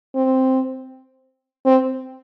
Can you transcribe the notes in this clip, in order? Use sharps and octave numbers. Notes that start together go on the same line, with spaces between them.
C4
C4